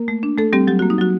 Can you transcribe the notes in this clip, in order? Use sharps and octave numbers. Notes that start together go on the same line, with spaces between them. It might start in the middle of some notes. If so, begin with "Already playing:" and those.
Already playing: A#3 A#4
A3
D4
A3 A4
G3 C4 G4
F#3 G4
A#3 F#4
D#4
F#3 F#4